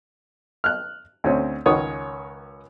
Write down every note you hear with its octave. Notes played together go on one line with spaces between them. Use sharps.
F6 F#6
D2 C4 C#4
C#2 D#3 C#5 F#5 D#6